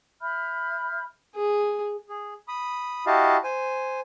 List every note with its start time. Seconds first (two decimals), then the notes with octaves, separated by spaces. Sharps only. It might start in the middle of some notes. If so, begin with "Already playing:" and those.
0.21 E5 B5 F6 G6
1.36 G#4
2.09 G#4
2.48 B5 D#6
3.07 E4 F#4 G4 D#5 F5 A5
3.44 C5 G#5